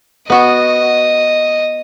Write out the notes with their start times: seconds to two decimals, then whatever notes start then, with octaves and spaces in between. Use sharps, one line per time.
0.30 B3 F#4 D#5